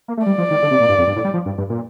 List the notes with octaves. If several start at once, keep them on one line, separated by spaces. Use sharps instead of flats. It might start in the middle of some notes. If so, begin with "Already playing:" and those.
A#3
A3
G3 D5
F3
D#3
D3
C3
A#2
G2
F2
G2
A2
G3
F3
G2
G2
A#2